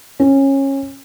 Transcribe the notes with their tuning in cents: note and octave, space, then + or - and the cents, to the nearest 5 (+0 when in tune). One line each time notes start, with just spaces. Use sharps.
C#4 -20